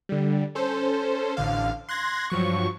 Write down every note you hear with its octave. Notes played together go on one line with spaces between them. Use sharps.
D3 G3
C#4 A4 C5
A1 D3 F5
C6 F#6 G#6 A#6
G2 F3 F#3 C#6